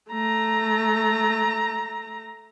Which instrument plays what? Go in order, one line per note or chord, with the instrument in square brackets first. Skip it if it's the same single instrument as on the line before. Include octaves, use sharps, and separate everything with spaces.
[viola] A3 A#5